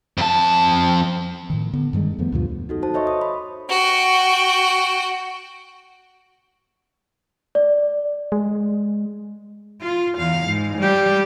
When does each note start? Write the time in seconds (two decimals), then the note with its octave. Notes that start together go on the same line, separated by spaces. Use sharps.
0.18 F2 A5
1.50 A2 D#3
1.73 D3 B3
1.93 G2 D#3 G3 G#3
2.19 F2 F3 A3 B3
2.32 D2 G2 B2 F3
2.69 D#4 F#4 A4
2.82 F#4 C5 A5
2.94 C5 C#5 D#5 E5 C6 C#6
3.07 D#6
3.21 B5
3.69 F#4 G5
7.55 D5
8.32 G#3
9.82 F4
10.18 E2 F5
10.48 G#2
10.78 G3 G4